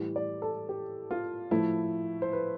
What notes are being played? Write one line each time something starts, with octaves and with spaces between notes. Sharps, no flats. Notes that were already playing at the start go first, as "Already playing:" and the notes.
Already playing: A2 E3 G3
D5
A4
G4
F4
A2 F3 A3 E4
C5
B4